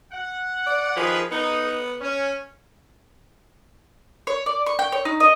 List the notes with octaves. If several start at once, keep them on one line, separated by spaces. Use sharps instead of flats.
F#5
D5
D#3 F3 G#4 B4
B3 D#4
C#4
C#5
D5
C#6
G5
C#5
D#4
D#5